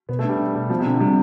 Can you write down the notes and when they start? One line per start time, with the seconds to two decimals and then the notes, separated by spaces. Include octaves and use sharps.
0.09 B2 B3
0.19 A3
0.25 G3 D4
0.39 D4
0.54 B2 G3
0.70 F3 B3
0.80 C3
0.86 B2 D3
1.00 C3 G3